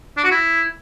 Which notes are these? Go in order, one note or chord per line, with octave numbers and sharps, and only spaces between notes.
D4
F#4
E4